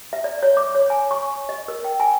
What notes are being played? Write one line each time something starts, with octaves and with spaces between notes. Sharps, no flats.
E5
D5
C#5
D6
C#5
G#5
C#6
D#5
A#4
G5
G#5